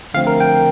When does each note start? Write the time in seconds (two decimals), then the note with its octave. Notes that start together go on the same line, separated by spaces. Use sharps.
0.14 D3 F3 A3 C4 F5
0.27 A#4
0.40 G5